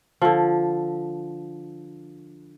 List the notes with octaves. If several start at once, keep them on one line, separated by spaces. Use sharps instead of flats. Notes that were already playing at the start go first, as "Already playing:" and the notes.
D3 F3